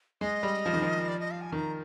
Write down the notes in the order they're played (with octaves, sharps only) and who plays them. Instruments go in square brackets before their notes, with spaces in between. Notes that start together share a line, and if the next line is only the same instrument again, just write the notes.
[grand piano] G#3 [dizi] D#5
[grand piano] G3
F3
D#3
F3
[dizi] D5
D#5
F5
G#5
[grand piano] D#3 [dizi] A#5